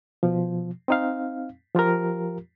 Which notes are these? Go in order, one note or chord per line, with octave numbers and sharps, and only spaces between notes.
B2 F3
C4 D#4 F5
F3 F4 G4 A#4